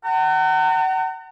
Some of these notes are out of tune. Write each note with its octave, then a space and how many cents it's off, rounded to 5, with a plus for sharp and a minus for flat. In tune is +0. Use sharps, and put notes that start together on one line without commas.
F#5 +35 A#5 -40